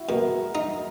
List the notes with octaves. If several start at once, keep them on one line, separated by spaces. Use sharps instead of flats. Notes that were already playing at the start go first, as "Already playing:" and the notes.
Already playing: E4 F#4
B2 A#4
D#4